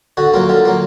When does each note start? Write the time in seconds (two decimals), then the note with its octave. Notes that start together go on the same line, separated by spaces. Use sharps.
0.17 D3 F#4
0.34 F#3 A#3 F4
0.49 D3 F4
0.65 F#3 A#3